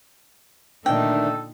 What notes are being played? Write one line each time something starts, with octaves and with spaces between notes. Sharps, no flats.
A#2 D3 D#3 A3 D4 D#4 A4 G5